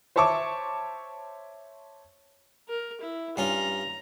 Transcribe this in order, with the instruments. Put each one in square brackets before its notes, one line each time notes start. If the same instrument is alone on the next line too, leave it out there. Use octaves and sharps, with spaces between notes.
[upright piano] C5 C#5 E5 A5 C#6 D6
[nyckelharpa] A#4
E4
[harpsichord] G2 C#4 F4 [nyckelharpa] A#5